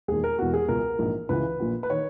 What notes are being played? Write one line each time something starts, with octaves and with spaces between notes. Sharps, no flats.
E1 D#2 D#3 G#4
A#4
E1 E2 B2 F#4
G#4
C#2 B2 A#4
A#1 G#2 E3
C#2 C#3 E3 B4
A#1 A#2
B4
D#3 C#5